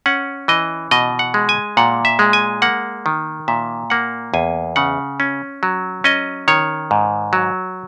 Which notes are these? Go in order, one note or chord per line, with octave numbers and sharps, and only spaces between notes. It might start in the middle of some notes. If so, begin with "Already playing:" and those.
C#4 F#5
E3 D#5
B2 D#5
F#5
G#3
G#5
A#2 F#5
E5
G#3
G#5
A#3 F#5
D#3
A#2 E5
A#3 F#5
E2 G#5
C#3 F#5
C#4
F#3
C#4 D#5
D#3 C#5
G#2
F#3